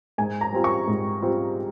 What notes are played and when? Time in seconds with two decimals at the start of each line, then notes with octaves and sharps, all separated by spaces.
0.18 G#2 G#5
0.41 A#5
0.53 G3 C4 F4
0.64 C#6
0.88 G#2
1.22 G3 C4 F4